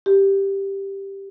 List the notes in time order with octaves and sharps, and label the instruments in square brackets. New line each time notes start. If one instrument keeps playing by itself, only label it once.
[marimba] G4